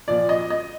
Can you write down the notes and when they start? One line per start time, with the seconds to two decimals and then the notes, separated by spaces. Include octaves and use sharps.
0.08 A#2 F3 D5
0.29 D#5
0.50 D#5